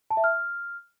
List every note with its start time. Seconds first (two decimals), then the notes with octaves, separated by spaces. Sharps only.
0.11 A5
0.17 E5
0.24 F6